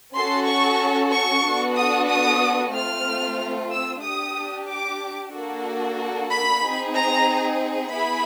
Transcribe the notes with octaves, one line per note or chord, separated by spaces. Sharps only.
C#4 F#4 A4 C6
C#6
C#6
B3 D4 F#4 A4
D#6
D#6
A3 C4 F4 F6
E6
D4 G4 D#6
D6
A#3 D4 F#4 A4
B5
C4 D#4 G#4
A#5
B3 E4 G#4 B5